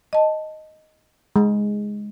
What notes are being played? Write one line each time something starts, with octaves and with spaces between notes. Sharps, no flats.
D#5 A5
G#3